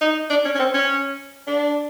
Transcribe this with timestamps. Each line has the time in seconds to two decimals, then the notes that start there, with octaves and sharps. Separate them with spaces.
0.01 D#4
0.30 D4
0.45 C#4
0.55 C#4
0.59 C4
0.74 C#4
1.47 D4